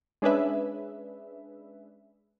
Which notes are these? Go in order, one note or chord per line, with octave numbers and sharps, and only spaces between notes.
G#3 C#4 D4 G#4 B4 E5